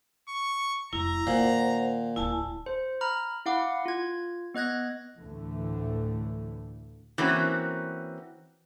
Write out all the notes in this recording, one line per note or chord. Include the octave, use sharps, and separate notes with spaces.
C#6
F1 E4 A#5
A#2 D#3 C5 F#5
D1 D#2 E4 G#5 A5
C5
A#5 B5 F6
E4 F5 F#5 D6
F4 G#6
B3 D#5 F#6 G#6 A#6
D2 A2 D3 E3 A3
E3 A#3 C4 C#4 F#4